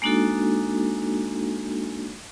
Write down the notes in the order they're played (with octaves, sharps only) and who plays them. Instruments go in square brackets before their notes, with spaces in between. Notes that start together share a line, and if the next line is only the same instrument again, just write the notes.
[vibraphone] G#3 A#3 D4 D#4 F#4 A4